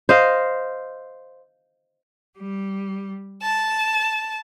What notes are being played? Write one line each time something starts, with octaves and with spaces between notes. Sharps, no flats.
C5 D#5 F5
G3
A5